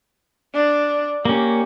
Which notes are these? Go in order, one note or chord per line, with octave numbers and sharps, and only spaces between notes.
D4
A#3 C#4 G4